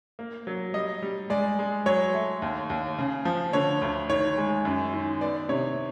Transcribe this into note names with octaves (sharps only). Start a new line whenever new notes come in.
A#3
F#3
G3 D#5
G3
G#3 D5
G#3
F#3 C#5
A3
D#2
D#2
C#3
F3
D3 C#5
D2
D#3 C#5
G#3
F#2
D#3
B3 D5
C3 C#5